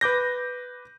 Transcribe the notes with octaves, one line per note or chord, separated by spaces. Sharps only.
B4 D6 G6 A#6